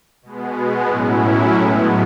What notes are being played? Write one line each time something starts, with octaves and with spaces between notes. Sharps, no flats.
B2 G#3 B3
A2 F#3 C#4 E4
A2 G#3 B3